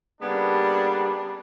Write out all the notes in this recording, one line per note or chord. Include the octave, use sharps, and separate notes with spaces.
C#3 G3 A#3 B3 D4